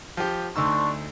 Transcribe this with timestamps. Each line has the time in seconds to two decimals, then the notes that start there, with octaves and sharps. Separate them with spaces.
0.17 F3 G4
0.56 D2 D4 D#4 C5 C#6 E6